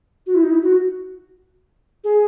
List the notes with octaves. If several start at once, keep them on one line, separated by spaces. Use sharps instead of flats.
F#4
E4
D#4
E4
F#4
G#4